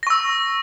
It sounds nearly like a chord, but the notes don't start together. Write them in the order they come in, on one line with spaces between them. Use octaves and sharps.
A#6 C#6 E6